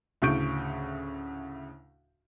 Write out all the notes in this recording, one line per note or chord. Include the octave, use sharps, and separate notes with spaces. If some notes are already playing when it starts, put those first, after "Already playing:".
D2 A2 C#3 C#6 G6 D7